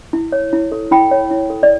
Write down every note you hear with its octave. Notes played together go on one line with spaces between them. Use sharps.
E4
C#5
E4
A4
E4 G5 B5
C#5
E4
A4
D5